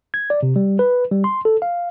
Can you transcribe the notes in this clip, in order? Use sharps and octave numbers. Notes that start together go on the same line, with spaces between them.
G#6
D5
C3
G3
B4
G3
C6
A4
F5